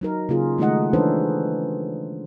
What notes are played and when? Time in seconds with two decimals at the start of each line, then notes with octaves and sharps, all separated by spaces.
0.01 F#3 D#4 A#4
0.29 C#3 A#3 F4 G#4
0.58 D#3 G#3 A3 D#4 D#5 F#5
0.93 E3 C#4 D4 A4 B4 C5